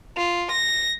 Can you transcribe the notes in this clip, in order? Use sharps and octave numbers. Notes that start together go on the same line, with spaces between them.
F4
A#6